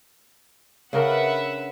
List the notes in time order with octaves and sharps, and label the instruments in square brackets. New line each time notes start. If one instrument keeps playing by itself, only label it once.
[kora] C#3 D4 A#4 [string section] B4 E5 F#5